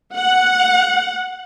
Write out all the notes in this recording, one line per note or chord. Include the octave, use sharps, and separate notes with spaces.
F#5